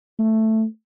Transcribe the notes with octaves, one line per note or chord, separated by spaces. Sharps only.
A3